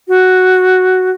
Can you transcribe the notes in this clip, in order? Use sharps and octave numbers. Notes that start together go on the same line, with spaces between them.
F#4